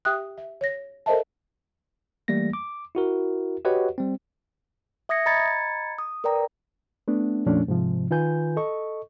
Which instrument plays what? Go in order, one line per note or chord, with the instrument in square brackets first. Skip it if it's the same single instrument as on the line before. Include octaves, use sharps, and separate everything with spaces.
[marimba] G4 E5 G5 D#6 F#6
E5
C#5 A#6
A4 A#4 C5 D#5 E5 A5
[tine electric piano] E3 G3 A3 A#3 A#6
D6
E4 F#4 A#4
F#4 G4 B4 C#5 D#5 F#5
G3 C4
[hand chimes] E5 D#6 G#6 A#6 C#7
D#5 A#5 B5 G#6 A6 C#7
D#6
A#4 B4 D5 G5 A#5
[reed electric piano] A3 B3 D4
F2 A#2 F3 A3 C#4 D4
G#2 C3 F3
D#3 F4 B4 G#5 G6
A4 D#5 C#6